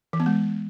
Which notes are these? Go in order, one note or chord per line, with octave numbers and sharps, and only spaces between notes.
E3
B3
G#3